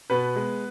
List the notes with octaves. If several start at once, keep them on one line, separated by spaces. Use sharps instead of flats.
B2 B3 B4
G#3